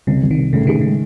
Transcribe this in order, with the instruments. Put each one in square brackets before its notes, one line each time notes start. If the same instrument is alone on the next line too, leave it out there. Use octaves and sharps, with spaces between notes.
[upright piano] C2 [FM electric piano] C#3
[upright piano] C2
[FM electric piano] D#3
[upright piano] C3
[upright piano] A2 [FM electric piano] C#3
[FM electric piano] D#3 [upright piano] G#4
[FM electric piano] C#3
[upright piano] G#3